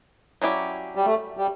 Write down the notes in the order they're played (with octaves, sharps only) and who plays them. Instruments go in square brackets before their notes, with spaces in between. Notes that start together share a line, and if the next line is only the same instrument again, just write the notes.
[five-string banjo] F#3 C#4 E4 G4 D5
[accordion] G3
A3
G3